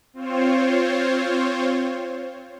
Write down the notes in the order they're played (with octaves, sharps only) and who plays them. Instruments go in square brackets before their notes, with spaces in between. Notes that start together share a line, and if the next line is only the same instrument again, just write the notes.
[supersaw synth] C4 F4 C5 C#5